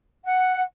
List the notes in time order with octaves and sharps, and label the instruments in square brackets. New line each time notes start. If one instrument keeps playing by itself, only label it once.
[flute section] F#5